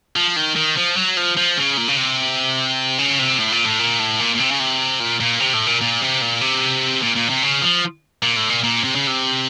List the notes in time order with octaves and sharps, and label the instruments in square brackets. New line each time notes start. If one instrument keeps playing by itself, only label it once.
[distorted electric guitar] F3
D#3
D#3
F3
F#3
F3
F3
C#3
A#2
C#3
C3
C#3
C3
A2
A#2
A2
A#2
A2
A#2
A#2
C3
C#3
C3
A#2
A#2
C3
A2
A#2
A#2
C3
A#2
C3
A#2
A#2
C3
C#3
F3
A#2
A2
A#2
A#2
C3
C#3
C3